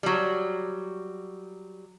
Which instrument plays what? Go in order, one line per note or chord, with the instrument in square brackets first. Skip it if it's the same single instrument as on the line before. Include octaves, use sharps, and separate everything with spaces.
[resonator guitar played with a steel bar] F#3 G3